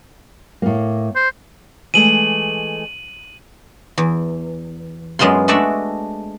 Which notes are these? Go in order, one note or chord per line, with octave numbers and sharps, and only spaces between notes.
A2 A#3
C5
E3 G#3 A3 D#7 F#7
E2
F#2 G#3 B3 F4 C6
G#3 A3 D4 F#4 D5 E5